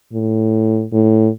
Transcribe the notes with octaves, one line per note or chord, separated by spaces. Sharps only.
A2
A2